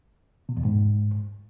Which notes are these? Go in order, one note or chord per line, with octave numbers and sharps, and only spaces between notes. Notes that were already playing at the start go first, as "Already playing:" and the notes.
B2
E2
G#2